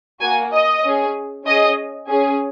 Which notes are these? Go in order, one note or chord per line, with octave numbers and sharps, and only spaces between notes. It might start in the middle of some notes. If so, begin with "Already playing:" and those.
A#3 F#4 G#5
D#5
C#4 G#4
C#4 G#4 D#5
C#4 G#4